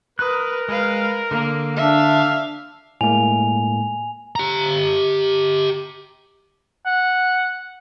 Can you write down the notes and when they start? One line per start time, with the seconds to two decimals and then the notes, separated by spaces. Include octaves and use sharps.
0.19 A#4 B4 D#6 F#6
0.69 G#3 B4 F5
1.31 D3 A#3
1.76 D4 E5 F5
3.01 A2 G#3 A#3 G#5 F7
4.36 G4 A#5
6.85 F#5